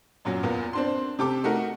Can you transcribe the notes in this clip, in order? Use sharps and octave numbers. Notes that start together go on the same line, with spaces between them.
F#2 A#2 F#3
E2 A#2 A#3 B3
C4 D4 C6
C3 G4 A4 D6
A3 D#4 F#4 A#4